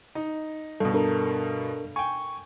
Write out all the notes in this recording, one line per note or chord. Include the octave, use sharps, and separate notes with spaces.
D#4
G2 B2 A4
D4 A4 A#4
G5 G#5 C#6